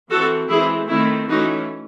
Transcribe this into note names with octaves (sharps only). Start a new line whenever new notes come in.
E3 C4 F#4 A4
E3 G#3 C4 E4 G#4
D#3 A3 C4 E4
E3 A3 C#4 D#4 F#4